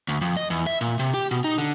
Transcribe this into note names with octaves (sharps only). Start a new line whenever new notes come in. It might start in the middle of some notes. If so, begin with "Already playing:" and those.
D2
F2
D#5
E2
E5
A#2
C3
G4
B2
D#4
D3